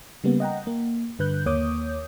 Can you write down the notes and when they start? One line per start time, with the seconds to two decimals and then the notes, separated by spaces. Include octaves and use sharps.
0.24 C#3 G3 A#3 B3
0.40 D#5 F#5 G5 A#5
0.67 A#3
1.19 G2 D3 B4 F#6 G6
1.46 D#2 A#3 C#5 D6 D#6 G6